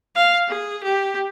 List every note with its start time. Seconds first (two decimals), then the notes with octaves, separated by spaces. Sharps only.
0.15 F5
0.48 G#4
0.83 G4